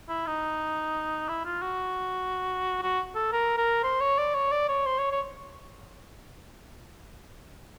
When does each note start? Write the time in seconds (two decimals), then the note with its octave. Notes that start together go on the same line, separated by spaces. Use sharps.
0.09 E4
0.27 D#4
1.29 E4
1.45 F4
1.62 F#4
2.82 F#4
3.15 A4
3.32 A#4
3.58 A#4
3.83 C5
4.01 C#5
4.18 D5
4.35 C#5
4.52 D5
4.69 C#5
4.86 C5
4.98 C#5
5.12 C#5